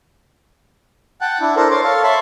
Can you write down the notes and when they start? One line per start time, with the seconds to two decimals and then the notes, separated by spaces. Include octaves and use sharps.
1.21 F#5 G5 A5 F#6
1.41 D4 E4
1.56 D4 A4 A#4 C5
1.71 A#4 C5 C#5 C6 D6
1.84 A4 C#5 F5 A5 C6
2.03 C#5 E5 A5 B5 C6